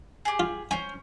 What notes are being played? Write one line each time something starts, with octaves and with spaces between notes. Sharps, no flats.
G4 G#4
F4
C#4 C5 G#5